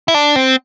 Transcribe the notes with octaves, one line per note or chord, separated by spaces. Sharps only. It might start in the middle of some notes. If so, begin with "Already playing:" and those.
E4
D4
C4